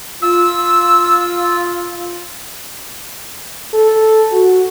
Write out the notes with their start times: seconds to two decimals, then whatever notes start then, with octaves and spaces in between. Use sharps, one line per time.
0.22 F4 E6
3.74 A4
4.32 F#4